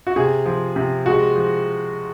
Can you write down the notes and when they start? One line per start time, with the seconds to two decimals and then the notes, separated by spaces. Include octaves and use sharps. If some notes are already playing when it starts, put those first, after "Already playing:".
0.07 F#4
0.16 C3 G#4
0.46 F3
0.76 C3
1.06 G#3 F#4
1.36 F3